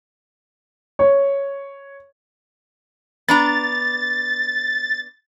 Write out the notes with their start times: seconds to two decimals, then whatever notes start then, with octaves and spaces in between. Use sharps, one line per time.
0.99 C#5
3.28 B3 D4 A#5 A6